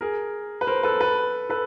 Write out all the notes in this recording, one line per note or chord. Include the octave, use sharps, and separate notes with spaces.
G#4 A#4
B4
A#4 C5
A4 B4
A4 B4
A4 B4